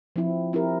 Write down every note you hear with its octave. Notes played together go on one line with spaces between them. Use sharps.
F3 C4 E4
C4 E4 G4 A#4